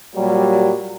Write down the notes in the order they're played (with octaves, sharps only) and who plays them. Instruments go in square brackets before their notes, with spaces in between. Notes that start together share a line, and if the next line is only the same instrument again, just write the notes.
[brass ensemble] A#2 F#3 G3